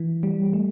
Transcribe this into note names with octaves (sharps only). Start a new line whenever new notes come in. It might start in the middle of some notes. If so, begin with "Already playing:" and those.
Already playing: E3
G3
A3